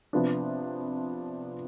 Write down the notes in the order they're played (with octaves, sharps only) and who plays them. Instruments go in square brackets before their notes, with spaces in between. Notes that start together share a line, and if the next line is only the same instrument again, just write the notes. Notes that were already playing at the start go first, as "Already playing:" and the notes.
[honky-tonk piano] C3 F3 B3 D4